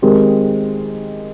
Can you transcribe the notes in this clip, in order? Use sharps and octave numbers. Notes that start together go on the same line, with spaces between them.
D#3 G#3 C4 G4 A#4